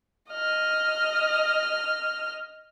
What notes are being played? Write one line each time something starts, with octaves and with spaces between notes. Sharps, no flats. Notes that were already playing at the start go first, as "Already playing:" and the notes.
D#5 F6